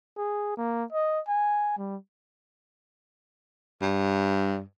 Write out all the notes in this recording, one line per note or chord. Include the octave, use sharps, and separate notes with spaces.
G#4
A#3
D#5
G#5
G3
G2